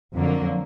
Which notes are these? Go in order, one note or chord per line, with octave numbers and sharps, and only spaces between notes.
F2 D3 F#3 A#3